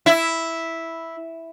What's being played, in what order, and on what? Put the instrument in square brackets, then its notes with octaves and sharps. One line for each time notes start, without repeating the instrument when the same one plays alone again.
[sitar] E4